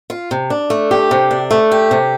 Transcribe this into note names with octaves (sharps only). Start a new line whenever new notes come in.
F4
C3
D4
A3
G4
C3
D4
A3
G4
C3